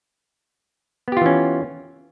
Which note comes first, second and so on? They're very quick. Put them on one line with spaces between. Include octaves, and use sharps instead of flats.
B3 G4 F4 E3 C#4